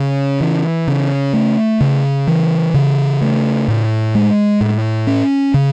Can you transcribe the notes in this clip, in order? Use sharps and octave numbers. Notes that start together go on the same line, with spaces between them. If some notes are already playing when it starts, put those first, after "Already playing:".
Already playing: C#3
E3
C#3
A3
C#3
E3
C#3
A3
A2
G#3
A2
C#4
C#3